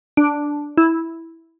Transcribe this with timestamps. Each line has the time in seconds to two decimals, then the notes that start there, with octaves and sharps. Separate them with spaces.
0.17 D4
0.77 E4